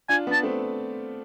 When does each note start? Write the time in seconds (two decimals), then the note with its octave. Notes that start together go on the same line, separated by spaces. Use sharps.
0.09 D4 F4 G#5
0.27 B3 D4
0.32 A5
0.43 A3 C4